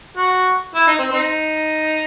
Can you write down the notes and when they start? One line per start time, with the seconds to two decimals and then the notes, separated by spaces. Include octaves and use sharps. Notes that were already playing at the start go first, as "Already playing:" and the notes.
0.17 F#4
0.75 E4
0.88 D#4
0.99 C4
1.11 C4 D#4